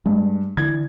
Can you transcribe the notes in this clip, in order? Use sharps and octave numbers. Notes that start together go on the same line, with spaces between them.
G2 G#3
D3 E3 G#6